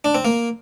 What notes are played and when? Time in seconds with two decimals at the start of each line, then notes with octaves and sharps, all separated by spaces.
0.05 D4
0.15 C4
0.25 A#3